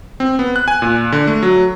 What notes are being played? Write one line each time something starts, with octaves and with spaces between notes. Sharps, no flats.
C4
B3
F#6
G#5
A#2
D3
A3
F#3